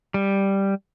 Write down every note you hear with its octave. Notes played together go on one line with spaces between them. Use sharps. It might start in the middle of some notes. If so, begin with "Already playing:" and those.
G3